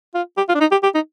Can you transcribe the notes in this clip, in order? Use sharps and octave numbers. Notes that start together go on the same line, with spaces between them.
F4
G4
F4
D4
D#4
G4
G4
D#4